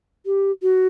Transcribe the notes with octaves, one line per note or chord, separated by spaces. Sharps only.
G4
F#4